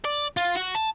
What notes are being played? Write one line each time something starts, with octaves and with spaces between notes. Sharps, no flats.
D5
F4
F#4
A5